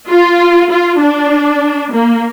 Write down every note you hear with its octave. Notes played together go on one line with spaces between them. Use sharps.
F4
F4
D4
A#3